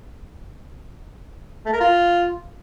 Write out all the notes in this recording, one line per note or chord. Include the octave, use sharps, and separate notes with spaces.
A3
A#4
F4